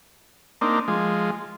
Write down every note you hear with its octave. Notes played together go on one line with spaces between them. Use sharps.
A#3 C4 D4 D#4
F3 G#3